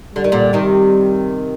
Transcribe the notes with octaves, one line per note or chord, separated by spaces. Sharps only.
D3 G3
D#3
A#2 D3
C3 D#3